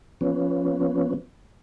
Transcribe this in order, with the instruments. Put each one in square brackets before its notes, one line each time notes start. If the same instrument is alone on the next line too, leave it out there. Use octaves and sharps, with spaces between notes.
[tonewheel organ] F3 B3 C#4